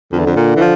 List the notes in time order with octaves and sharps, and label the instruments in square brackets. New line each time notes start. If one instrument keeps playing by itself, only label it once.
[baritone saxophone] F2 [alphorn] D3
[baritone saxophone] E2
F2
A#2
E3
F3